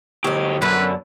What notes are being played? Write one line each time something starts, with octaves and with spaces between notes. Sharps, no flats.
D2 F#3 G4 D#5
F#2 D3 B3 B4